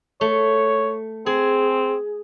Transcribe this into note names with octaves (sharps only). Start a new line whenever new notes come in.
A3 C#5
C4 G#4